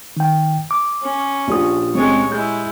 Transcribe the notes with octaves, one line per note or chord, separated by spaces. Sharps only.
D#3 G5
D6
C#4
A#1 A#2 A#3 F4 G4 D#6
C#2 G#3 C4 C#5
G#3 E4 G6